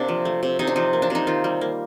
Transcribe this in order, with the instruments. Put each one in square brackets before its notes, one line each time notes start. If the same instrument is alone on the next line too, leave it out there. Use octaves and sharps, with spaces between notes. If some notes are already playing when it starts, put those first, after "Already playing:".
Already playing: [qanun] C3 A#3 D4
F3
A3
C3
C3 D#4
D4
F3 D#4
A#3
D4
C3 D#4
D#3 F4
G3
A#3